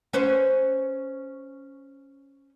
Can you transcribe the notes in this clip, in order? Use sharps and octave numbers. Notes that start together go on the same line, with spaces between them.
C#4 B4 C5